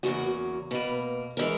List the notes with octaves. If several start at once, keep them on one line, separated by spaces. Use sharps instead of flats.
E2 C#3 F#3 A#3 F#4
B2 A#3 B4
E3 G#3 A#4